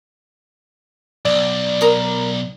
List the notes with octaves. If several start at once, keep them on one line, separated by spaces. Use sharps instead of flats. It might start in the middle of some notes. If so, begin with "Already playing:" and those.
B1 D5
A#4 D#6